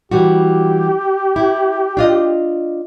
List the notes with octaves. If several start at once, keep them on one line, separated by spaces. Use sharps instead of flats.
E3 G3 F#4 G4
E4
D4 F4 D#5